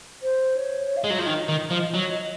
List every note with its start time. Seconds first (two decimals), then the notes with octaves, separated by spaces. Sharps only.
0.22 C5
0.57 C#5
0.80 C#5
0.97 F5
1.02 G#3 D#5
1.10 F#3
1.18 F3 F5
1.25 D#3 D#5
1.49 D#3
1.71 F3
1.94 F#3